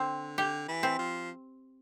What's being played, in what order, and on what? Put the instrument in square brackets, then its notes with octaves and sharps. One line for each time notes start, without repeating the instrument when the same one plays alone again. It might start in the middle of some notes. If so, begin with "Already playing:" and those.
Already playing: [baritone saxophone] D3 [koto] C4
[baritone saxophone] D3 [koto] G4
[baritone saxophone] E3
[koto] C4
[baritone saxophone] F3